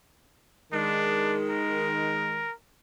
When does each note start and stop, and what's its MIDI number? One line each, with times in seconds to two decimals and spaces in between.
0.72 2.46 51
0.72 2.46 56
0.72 1.35 62
1.50 2.53 70